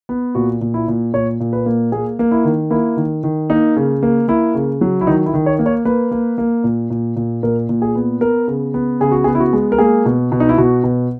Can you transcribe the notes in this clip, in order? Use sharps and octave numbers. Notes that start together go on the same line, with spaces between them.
B3
A#2 F#4
A#2
E4
A#2
A#2 C#5
A#2
B4
A#3
A#3 G#4
A#3
E4
D#3
A#3 E4
D#3
D#3
A#3 D#4
C#3
A#3
A#3 E4
C#3
F#3
E4
D#3 D#4
E4
D#3
C#5
A#3
C#5
A#3 B4
A#3
A#3
A#2
A#2
A#2
A#2 A#4
A#2
G#4
B3
B3 A#4
C#3
B3
C#3 G#4
F#4
G#4
B3
E4
F#4
G#3
A#4
A#3 G#4
B2
B2
D#4
E4
B2 F#4
B2